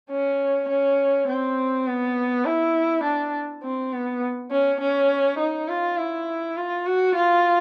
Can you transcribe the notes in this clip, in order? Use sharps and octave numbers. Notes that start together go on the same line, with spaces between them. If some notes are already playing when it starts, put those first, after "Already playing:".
C#4
C#4
C4
B3
E4
D4
C4
B3
C#4
C#4
D#4
F4
E4
F4
F#4
F4